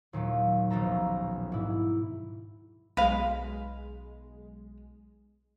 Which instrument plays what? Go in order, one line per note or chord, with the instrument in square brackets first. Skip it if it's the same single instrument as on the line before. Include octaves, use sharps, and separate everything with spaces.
[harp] D#2 A#2 F#3 A3
D#1 A#1 B2 A4 A#5
G#2 E4
[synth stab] B1 G#3 [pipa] B4 F5